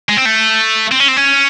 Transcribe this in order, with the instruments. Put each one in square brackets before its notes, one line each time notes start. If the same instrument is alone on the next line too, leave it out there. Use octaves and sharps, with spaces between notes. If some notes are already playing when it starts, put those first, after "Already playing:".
[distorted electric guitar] G#3
C4
A3
C4
C#4
C4
C#4